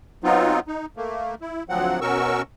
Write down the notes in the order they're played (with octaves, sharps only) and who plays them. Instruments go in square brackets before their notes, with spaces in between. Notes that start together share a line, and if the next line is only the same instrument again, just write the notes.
[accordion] F#3 B3 C4 D#4 F4
D#4
A3 A#3
E4
D2 F3 F#3 C4 F#5
B2 C#4 F#4 A#4 C#6 E6